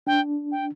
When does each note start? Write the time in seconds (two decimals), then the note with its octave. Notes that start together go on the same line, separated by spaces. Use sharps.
0.07 D4 G5
0.52 G5